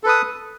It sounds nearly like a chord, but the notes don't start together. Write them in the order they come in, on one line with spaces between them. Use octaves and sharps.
A4 B4 D#6